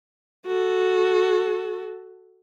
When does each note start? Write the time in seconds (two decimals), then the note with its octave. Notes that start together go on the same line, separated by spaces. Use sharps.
0.47 F#4 A4